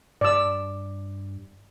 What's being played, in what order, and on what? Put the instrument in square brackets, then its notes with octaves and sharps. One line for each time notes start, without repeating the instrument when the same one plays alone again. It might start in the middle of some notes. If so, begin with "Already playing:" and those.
[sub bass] G2 [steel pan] D5 E6